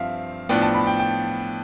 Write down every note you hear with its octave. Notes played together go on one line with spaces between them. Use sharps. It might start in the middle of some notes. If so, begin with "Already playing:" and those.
Already playing: G2 F3 C4 E5 F5
A2 F3 B3 D4 G5
A5
B5
G5
G5